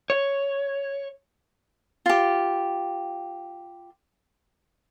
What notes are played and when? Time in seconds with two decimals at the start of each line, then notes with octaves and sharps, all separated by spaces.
0.10 C#5
2.06 F4 G4